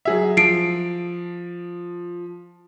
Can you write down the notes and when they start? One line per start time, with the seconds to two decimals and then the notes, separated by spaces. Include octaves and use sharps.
0.05 F#3 G#4 E5
0.37 F3 C7 D7